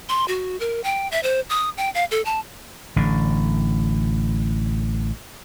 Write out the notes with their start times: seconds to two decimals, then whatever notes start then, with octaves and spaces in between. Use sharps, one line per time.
0.09 C6
0.28 F#4
0.60 A#4
0.84 G5
1.12 E5
1.23 C5
1.50 D#6
1.77 G5
1.95 F5
2.11 A4
2.25 A5
2.96 A1 D3